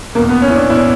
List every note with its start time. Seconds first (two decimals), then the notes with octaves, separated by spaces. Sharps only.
0.15 B2 A#3
0.19 E2
0.29 B3
0.42 C#4
0.50 E4
0.56 D4
0.70 E2 B2 E4